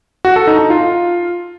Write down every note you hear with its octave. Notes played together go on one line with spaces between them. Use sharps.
F#4
A4
D#4
D#4
F4